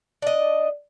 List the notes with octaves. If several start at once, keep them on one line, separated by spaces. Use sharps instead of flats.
D4 D#5